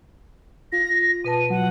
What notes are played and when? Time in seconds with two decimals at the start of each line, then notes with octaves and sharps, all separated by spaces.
0.72 F4 A#6
1.24 B2 B4 A5 D#7
1.50 F#3 F#5